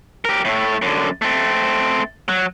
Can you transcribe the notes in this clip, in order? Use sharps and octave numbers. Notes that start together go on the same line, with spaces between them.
G4 A#4
A2 A3
F#2 D3
A3 C4
F#3